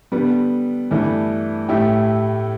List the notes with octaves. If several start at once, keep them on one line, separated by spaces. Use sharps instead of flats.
D3 G3 B3
G2 E3 A3 D4
A2 A3 E4 G4